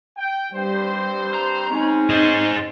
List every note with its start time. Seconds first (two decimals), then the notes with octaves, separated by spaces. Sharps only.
0.18 G5
0.54 G2 G3 C4 C5
1.34 A#5
1.70 G#3 C4 C#4 D#4
2.10 G#4 C5 D#5